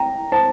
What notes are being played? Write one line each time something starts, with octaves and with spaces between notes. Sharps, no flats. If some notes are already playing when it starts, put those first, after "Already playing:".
Already playing: G5 A#5
C5 A5